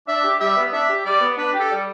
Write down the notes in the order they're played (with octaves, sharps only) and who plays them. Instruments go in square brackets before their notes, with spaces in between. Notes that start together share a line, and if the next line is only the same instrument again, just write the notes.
[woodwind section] D4 [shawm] E5
[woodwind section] G4
[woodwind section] G3 [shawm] E5
[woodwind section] B3
[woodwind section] D4 [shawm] E5
[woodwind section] G4
[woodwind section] G3 [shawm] D5
[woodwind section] B3
[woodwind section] D4 [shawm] B4
[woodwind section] G4
[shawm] A4
[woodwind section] G3